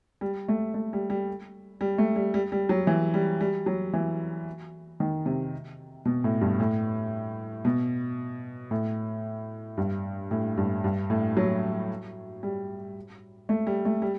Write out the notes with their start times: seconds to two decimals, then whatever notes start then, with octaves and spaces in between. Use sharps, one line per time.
0.21 G3
0.48 A3
0.74 A3
0.93 G3
1.10 G3
1.81 G3
1.98 A3
2.16 G3
2.34 G3
2.52 G3
2.69 F#3
2.87 E3
3.14 G3
3.41 G3
3.66 F#3
3.93 E3
5.00 D#3
5.26 C3
6.05 B2
6.24 A2
6.41 G2
6.60 A2
7.65 B2
8.71 A2
9.77 G2
10.31 A2
10.57 G2
10.84 G2
11.10 A2
11.37 F#3
12.43 G3
13.49 A3
13.67 G3
13.85 A3
14.02 G3